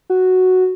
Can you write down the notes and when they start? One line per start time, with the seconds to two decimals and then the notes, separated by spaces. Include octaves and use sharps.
0.10 F#4